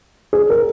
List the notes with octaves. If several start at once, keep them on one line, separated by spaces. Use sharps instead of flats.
G#4
A#4